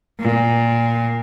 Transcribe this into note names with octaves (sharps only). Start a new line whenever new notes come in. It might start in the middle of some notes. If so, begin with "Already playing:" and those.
A#2